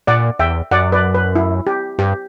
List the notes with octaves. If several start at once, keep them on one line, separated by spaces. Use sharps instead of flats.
A#2 D5 F#5
E2 E5 G5
F#2 D5 F#5
B4 D5
B4
E4
G4
G2 G4